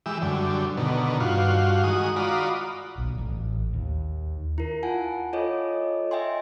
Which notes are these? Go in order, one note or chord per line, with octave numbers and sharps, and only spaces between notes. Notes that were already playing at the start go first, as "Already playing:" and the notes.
E3 G#3 G4 E6
F#2 D3 G3
B2 D3 D#3
G2 F4 F#4
D#3 G#3 F#4 D#6
F4 F#4 D5 A#5 B5 D#6
B1
A1
D#2
E4 A#4
F4 F#5 G#5 A5
F4 A4 C#5 D#5 D6
D#5 E5 G5 G#5 C6